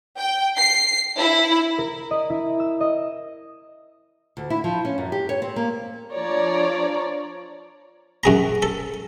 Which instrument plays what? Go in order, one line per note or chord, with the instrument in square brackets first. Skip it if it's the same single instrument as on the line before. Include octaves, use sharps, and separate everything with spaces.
[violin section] G5
C7
E4
[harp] A#4
D#5
E4
E6
D#5
[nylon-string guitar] D2
E4
F3
C#4
F#2
G4
C#5
C4
A#3
[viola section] F3 D4 C#5 D5 A#5
[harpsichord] F#2 G#4 A#5
A4